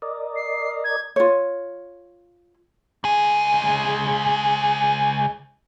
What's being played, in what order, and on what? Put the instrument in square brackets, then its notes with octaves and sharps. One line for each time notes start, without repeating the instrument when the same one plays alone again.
[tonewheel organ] A#4 D5 D#5
[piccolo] C7
G#6
[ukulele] F4 C#5
[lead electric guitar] C#2 G#4